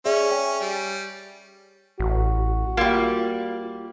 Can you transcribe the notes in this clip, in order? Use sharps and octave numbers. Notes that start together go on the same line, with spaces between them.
C#4 G#4 D5 E5
C#5 G5 G#5
G3
A1 F#4
G3 A#3 F4